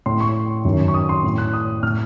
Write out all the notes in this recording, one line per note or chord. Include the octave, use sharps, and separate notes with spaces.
A2 C6
C#6
F#2 D#3
C#6
D#6
C6
A2
F#6
D#6
A2 F6